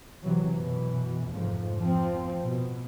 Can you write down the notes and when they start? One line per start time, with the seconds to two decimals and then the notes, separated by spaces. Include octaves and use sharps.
0.22 C3 E3 F#3
0.55 F#2 B2 E3
1.28 F1 F2 G#2 F3
1.80 F3 C4
2.41 B2